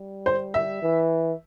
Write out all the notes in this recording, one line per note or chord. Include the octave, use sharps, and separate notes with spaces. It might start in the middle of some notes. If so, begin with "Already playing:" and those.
Already playing: G3
C5
E5
E3